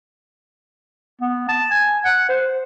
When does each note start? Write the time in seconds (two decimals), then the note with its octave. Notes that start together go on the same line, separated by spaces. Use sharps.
1.21 B3
1.49 A5
1.71 G#5
2.05 F#5
2.29 C5